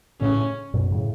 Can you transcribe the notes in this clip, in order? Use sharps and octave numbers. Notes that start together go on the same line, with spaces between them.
A2 C#3 C#4
F#2 B2
A2 C#3